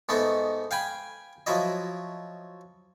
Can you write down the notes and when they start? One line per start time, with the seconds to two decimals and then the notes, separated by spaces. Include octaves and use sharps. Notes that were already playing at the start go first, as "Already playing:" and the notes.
0.09 G#2 A3 B3 D#4
0.71 F5 G5 G#5 B5
1.47 F3 F#3 E4 D#5